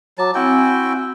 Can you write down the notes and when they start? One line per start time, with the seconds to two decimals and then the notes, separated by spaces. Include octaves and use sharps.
0.18 F#3 A5 A#5 D6
0.34 C4 E4 F#4 G5 G#5